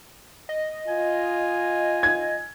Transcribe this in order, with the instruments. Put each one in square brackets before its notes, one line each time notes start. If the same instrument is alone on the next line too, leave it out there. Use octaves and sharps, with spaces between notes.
[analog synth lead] D#5
[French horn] F4 [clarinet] G#5
[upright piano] G#6